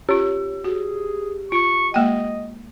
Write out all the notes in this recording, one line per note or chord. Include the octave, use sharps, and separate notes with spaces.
C#4 F4 G4
F#4 G#4
F4 C#6
G#3 A#3 D#5 G5